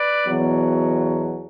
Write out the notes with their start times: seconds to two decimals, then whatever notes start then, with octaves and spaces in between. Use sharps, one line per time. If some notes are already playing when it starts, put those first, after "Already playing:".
Already playing: B4 D5
0.27 E2 B2 F#3